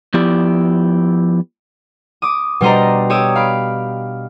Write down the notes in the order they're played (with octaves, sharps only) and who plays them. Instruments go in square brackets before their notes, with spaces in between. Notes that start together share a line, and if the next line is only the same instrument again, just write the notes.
[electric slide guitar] F3 B3 E4 G4 D5
[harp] D6 D#6
B2 G3 D4 C5 D#5 A#5
G4 C#5 D#6 E6
F5 B5 D7